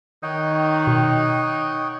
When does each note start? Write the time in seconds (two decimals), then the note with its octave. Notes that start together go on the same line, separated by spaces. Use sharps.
0.23 D#3 D#4 C#5 F#5 G5
0.87 B2